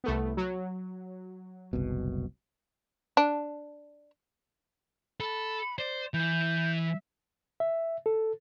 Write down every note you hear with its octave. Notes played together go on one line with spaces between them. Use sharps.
C2 A3 B3
F#3
F#1 C2 B2
D4
A4 B5
C5 D5
E3 G6
E5
E5
A4